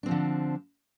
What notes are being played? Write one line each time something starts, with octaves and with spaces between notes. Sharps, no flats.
D3 F3 C4 D4